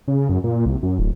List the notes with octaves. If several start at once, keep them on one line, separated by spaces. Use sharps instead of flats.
C#3
F#2
A#2
C2
F#2
D1